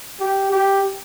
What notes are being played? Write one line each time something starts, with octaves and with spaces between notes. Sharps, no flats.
G4
G4